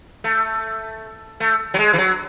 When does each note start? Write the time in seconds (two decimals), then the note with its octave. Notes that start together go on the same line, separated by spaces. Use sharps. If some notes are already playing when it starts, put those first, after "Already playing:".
0.24 A3
1.40 A3
1.74 F#3
1.79 G#3
1.93 E3
1.98 F#3